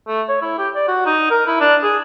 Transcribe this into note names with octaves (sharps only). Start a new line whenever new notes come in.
A3
C#5
E4
G4
D5
F#4
D#4
A#4
E4
D4
G#4